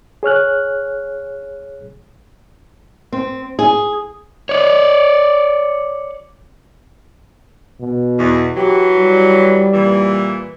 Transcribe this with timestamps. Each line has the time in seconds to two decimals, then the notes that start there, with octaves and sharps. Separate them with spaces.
0.23 G#4 C#5 F6 F#6
3.12 C4
3.59 G#4
4.49 C#5 D5
7.81 B2
8.19 E2
8.57 E3 F#3 G4
8.96 G3
9.74 A#2 E3